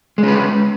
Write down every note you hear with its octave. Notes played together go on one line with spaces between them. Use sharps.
G#3 C#4 B4